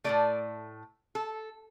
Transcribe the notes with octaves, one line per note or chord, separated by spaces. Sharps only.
A2 F3 A3 D5
A4